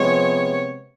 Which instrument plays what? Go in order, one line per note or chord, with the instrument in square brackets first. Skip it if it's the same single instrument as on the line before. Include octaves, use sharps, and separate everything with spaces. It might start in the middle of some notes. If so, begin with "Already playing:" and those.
Already playing: [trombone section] C3 F3 G#3 B3 [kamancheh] C#5